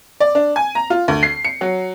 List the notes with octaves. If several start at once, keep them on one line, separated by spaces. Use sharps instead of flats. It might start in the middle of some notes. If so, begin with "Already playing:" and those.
D5
D4
G#5
A#5
F4
D2
C7
C#7
F#3